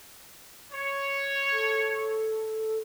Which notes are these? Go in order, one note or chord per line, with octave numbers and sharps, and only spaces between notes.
C#5
A4